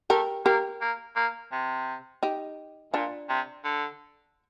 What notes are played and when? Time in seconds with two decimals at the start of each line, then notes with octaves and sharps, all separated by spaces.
0.10 A3 G4 A#4
0.45 A#3 G4 A#4
0.81 A#3
1.16 A#3
1.52 C3
2.23 D#4 G4
2.93 A#2 D4 F4
3.29 C3
3.64 D3